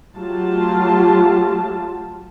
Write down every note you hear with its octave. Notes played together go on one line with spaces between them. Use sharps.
F#3 A3 F4 G4 A5